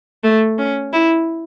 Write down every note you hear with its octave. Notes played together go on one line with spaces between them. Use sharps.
A3
C#4
E4